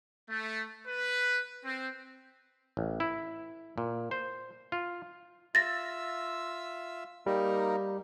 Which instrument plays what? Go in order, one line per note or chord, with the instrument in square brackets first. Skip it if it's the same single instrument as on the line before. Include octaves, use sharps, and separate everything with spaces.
[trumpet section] A3
B4
C4
[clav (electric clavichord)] A1
E4
A#2
C5
F4
[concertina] F4 E5 E6 [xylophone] A6 A#6
[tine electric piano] G3 [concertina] A#3 D#4 A#4